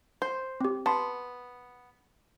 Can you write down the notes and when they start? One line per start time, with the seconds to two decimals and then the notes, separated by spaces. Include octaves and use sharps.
0.22 C5
0.61 C4 G4
0.86 B3 A5 C6